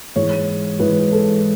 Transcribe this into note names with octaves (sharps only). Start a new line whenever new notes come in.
G#2 E3 G#3 C#5
G#2 E3 G#3 B4
A4